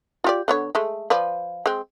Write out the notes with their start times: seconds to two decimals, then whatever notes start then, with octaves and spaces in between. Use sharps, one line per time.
0.24 F4 G4 D5
0.48 D3 B3 C#5
0.75 G#3 A3
1.10 F3 B4 D5
1.66 G#3 C4